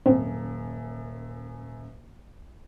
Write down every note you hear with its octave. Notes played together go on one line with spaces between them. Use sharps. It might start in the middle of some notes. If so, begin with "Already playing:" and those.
D#1 F#2 C4